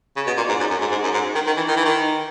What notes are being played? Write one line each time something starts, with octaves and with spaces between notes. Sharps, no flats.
C#3
B2
A#2
G#2
F#2
F#2
G#2
G#2
F#2
G#2
D#3
D#3
E3
D#3
E3
D#3